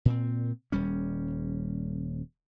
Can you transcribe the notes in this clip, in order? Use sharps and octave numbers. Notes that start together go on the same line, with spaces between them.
A#2 C4
D#1 G3 C#4